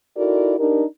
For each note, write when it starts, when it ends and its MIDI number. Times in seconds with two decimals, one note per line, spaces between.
0.17 0.54 63
0.17 0.54 64
0.17 0.54 66
0.17 0.54 69
0.17 0.54 70
0.17 0.54 74
0.59 0.83 62
0.59 0.83 63
0.59 0.83 67
0.59 0.83 70